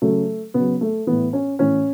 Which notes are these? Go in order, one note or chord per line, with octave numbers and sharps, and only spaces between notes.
C#3 F#3 A3
C#3 F#3 B3
A3
A2 E3 B3
C#4
A2 E3 C#4